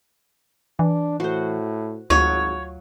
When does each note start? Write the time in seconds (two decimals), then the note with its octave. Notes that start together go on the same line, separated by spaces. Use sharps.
0.79 E3 D4
1.20 A2 F#4 C5
2.10 G#1 D2 F#3 F4 F#4 C#5